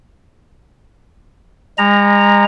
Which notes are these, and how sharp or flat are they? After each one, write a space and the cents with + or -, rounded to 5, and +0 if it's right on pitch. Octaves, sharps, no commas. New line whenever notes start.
G#3 -40 A#5 +0